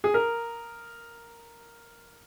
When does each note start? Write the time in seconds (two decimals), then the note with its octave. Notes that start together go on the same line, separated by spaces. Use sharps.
0.04 G#4
0.14 A#4